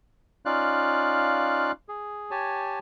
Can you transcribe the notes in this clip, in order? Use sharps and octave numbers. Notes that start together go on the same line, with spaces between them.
C#4 D#4 F4 D5 F5 F#6
G#4
G4 C#5 G#5 A5